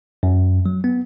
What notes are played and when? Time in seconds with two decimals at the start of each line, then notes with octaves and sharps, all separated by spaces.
0.23 F#2
0.66 F#3
0.84 B3